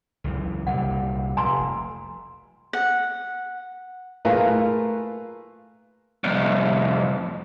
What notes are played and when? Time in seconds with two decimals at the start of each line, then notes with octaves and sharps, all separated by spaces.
0.24 C#2 F#2 E3
0.67 C2 A#2 G3 F#5
1.37 F1 G#5 A#5 C6
2.73 F#5
4.25 A3 A#3 F4 G#4 A#4 B4
6.24 C2 F2